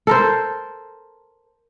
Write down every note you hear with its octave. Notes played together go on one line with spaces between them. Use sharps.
A4 A#4 C5